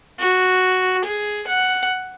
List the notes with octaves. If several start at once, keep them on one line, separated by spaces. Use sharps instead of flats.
F#4
G#4
F#5